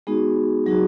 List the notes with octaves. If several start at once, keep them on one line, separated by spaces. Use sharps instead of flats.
G#3 B3 D#4 F#4 G#4
F#3 D#4 F#4 G#4